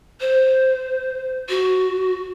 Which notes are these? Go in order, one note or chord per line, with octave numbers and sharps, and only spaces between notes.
C5
F#4